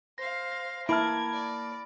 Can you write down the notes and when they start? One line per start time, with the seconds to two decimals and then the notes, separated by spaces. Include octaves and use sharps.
0.18 C5 F5 A#6
0.52 A#6
0.89 A#3 E4 A5 B5 F6 G#6 D7
1.33 D5